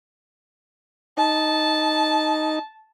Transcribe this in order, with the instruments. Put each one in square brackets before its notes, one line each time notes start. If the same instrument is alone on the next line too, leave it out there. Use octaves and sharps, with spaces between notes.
[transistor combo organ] D#4 [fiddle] A5